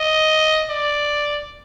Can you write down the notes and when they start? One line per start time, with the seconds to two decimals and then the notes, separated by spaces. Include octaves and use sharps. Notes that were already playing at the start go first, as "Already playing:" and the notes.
Already playing: D#5
0.69 D5